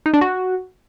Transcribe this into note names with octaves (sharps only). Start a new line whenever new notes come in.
D#4
D4
F#4